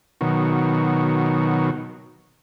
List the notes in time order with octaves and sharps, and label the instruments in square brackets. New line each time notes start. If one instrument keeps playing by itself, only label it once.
[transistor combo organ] B2 D#3 F#3